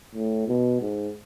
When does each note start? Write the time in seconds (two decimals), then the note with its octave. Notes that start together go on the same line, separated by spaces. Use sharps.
0.15 A2
0.48 B2
0.81 G#2